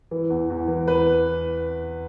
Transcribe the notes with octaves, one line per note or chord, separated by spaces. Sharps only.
E3
E2
E2
E3
E3 B4